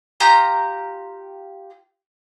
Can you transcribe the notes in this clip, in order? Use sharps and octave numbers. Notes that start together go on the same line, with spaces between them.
F4 G4 A#5 G6